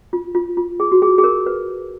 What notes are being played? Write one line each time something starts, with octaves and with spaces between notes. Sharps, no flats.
F4
F4
F4
G#4
F#4
G#4
G#4
A#4
B4